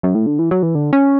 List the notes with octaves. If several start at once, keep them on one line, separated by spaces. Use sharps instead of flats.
F#2
A2
D3
E3
F#3
E3
D3
C#4